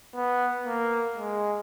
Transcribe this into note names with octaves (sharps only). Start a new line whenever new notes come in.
B3
A#3
G#3